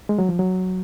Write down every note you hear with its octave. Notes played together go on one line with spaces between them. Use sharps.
G#3
F#3
F3
F#3